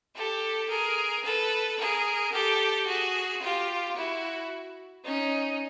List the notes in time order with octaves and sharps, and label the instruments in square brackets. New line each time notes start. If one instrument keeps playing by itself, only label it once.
[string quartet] G4 A4
G#4 A#4
A4 B4
G#4 A#4
G4 A4
F#4 G#4
F4 G4
E4 F#4
C#4 D#4